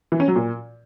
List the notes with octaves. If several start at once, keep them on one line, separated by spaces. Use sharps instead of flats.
E3
C#4
F#3
A#2